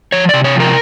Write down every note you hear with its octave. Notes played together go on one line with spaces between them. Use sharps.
F3 C#5
C3 D5
C#5
F3 A#4